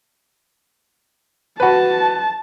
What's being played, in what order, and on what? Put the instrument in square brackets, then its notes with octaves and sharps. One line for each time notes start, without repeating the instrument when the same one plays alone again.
[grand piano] F#4 B4 [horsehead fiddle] A5